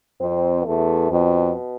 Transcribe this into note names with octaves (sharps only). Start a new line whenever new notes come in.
F2 C4
E2 A3
F2 B2